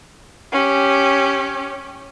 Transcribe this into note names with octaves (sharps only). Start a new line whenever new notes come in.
C#4 G4